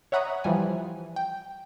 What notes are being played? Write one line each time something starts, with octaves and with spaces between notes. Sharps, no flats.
C#5 E5 F#5 A#5 B5 D#6
E3 F3 G3 G#5
G5